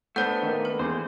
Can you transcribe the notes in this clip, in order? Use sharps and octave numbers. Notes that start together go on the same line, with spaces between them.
A3 B3 D4 C5 F#5 G6
D#3 A#3
B4
E2 C5